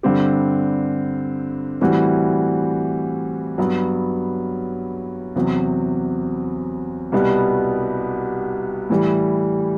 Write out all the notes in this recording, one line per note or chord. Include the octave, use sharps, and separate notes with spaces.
G2 D3 G3 C4 G4
A2 E3 G3 C4 F#4
G2 F#3 B3
E2 C3 F#3
C2 B2 G3 B3 F#4
A2 E3 G3